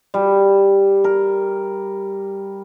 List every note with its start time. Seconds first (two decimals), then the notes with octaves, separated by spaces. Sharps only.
0.14 G3
1.04 A#4